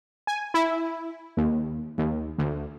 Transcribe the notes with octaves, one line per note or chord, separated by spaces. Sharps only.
G#5
E4
D#2
D#2
D2